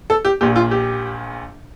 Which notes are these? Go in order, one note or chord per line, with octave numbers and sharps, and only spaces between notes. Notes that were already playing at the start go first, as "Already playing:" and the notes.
A4
G4
A#1 A#2 G4
F4
G4